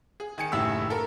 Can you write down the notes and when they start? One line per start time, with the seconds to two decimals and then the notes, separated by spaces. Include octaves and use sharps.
0.20 G#4
0.38 D#3 G#5 C#7
0.52 F#1 A2 D#3 G4 E5 E6
0.90 A4 A#4